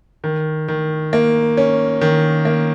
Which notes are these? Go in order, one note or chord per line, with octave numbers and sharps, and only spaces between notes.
D#3
D#3
A#3
C#4
D#3
A#3